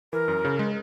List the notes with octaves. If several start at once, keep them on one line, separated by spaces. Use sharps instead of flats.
E3 A#4
F#2
C#3
G#3